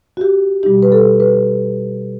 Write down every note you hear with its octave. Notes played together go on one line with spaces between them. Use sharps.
F#4
G4
B2 G3 D#4 G4
B4
A4
B4